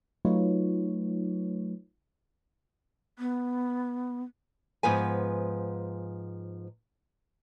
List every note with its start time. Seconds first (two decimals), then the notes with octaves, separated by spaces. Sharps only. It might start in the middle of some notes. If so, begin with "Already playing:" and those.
0.25 F#3 A3 D#4 F4 B4 C#5
3.19 B3
4.83 G#2 F3 B3 B4 G#5